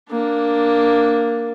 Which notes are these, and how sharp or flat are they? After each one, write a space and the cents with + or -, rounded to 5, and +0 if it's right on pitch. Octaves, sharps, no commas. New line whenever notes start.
A#3 +0 D4 +0